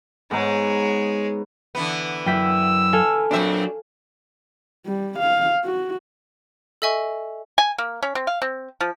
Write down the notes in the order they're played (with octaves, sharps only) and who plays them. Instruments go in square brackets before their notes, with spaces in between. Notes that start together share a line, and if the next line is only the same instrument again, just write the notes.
[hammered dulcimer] G#2 B3 A#5 [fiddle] G#3 C#5
[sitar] D3 E3 B3
[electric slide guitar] F#2 E4 [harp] G5 B6 [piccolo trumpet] E6
[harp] A4 F5 G#5
[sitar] A#2 C4 E5 [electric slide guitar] F#3 D4
[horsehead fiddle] G3
F5
F#4
[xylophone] A4 D#5 E5 G#5 C#6
[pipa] G#5
A#3
C#4
C4
F5
C4
F3